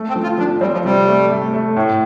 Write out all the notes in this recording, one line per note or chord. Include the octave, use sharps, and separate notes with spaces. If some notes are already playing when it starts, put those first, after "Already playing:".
Already playing: A3
C4
F3
F4
F3 D4
G3 C4
F3
C3 G3
A3
A3
A3
A2